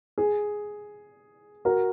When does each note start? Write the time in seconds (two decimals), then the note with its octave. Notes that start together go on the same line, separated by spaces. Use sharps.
0.18 G#4
1.65 F#4 A#4